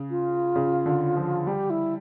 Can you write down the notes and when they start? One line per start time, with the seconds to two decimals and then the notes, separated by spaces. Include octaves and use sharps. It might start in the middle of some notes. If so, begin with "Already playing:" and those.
Already playing: C#3
0.10 F4
0.56 C#3
0.86 D3
1.17 F3
1.47 G3 G4
1.70 E4